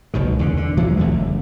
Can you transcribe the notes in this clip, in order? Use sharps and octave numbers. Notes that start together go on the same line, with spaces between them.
F#1 C#2 B2 D#3
E2 D3
D3
E3 F#3 G#3
C2 F2 D3 A3
F#1